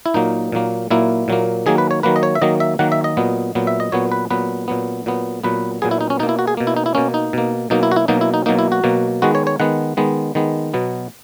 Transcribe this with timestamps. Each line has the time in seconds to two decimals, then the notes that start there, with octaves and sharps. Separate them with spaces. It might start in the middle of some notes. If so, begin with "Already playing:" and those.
0.06 E4
0.14 A#2 F#3 A#3 D#4
0.52 A#2 F#3 A#3
0.91 A#2 F#3 A#3 E4
1.28 A#2 F#3 A#3
1.66 D#3 F#3 A#3 G#4
1.78 B4
1.91 C#5
2.03 D#3 F#3 A#3 B4
2.16 D#5
2.23 C#5
2.35 E5
2.42 D#3 F#3 A#3 D#5
2.60 E5
2.79 D#3 F#3 A#3 F#5
2.92 E5
3.04 D#5
3.17 A#2 F#3 B3
3.55 A#2 F#3 B3
3.67 E5
3.80 D#5
3.92 A#2 F#3 B3 C#5
4.12 B4
4.30 A#2 F#3 B3 B4
4.68 A#2 F#3 B3
5.06 A#2 F#3 B3
5.44 A#2 F#3 B3 B4
5.82 A#2 F#3 B3 G#4
5.91 E4
6.01 D#4
6.10 C#4
6.19 B2 D#4
6.23 A#3
6.29 E4
6.39 F#4
6.47 G#4
6.57 B2 A#3
6.67 E4
6.77 D#4
6.86 E4
6.95 B2 A#3 C#4
7.14 D#4
7.33 B2 A#3
7.70 B2 F#3 A#3 D#4
7.83 E4
7.92 F#4
7.96 E4
8.08 B2 F#3 A#3 D#4
8.21 E4
8.34 D#4
8.46 B2 F#3 A#3 D#4
8.59 E4
8.72 F#4
8.84 B2 F#3 A#3
9.22 D#3 G#3 B3 F#4
9.35 C#5
9.47 C#5
9.60 D#3 G#3 B3 F#5
9.97 D#3 G#3 B3
10.35 D#3 G#3 B3
10.74 B2 F#3 B3